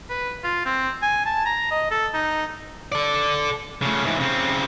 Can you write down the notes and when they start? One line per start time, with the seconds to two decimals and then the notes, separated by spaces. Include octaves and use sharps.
0.10 B4
0.44 F4
0.65 C4
1.02 G#5
1.25 A5
1.45 A#5
1.71 D#5
1.91 A4
2.14 D#4
2.92 A4 D5
3.82 C#3 A3
4.05 G#2 E3
4.20 C#3 C4